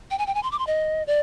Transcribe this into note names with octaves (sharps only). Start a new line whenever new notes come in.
G5
G#5
G5
G#5
C6
D6
C6
D#5
D5